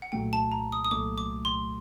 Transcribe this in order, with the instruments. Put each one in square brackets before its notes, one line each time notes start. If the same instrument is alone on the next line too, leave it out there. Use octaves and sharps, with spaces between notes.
[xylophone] F#5
[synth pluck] C2 A#2 F#3 A3 [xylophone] G5
[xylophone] A5
A#5
D#6
D#6
[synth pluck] C2 A#2 F#3 A3 [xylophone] D6
[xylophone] D6
C6